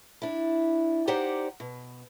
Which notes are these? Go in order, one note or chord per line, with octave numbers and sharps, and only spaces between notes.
D4 E4
D#4 G4 C5 D5 F#5 A#5
B2